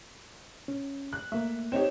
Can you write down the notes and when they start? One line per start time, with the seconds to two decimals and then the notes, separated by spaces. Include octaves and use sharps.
0.68 C#4
1.13 F#6
1.32 A3 A#3 E5
1.72 C4 D#4 G4 C#5